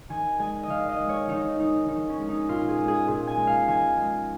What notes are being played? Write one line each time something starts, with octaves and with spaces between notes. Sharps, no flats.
D#3 G#5
G#3 G#5
D#5
D#3 F5
D#5
G#3
C#5
D#3 D#4
G#3 D#4
D#3 D#4
C#4
G#3
D#4
A#2 F4
G#4
G#3
G#4
A#2 G#4
G#5
G#3
F5
D#3 G#5
G#3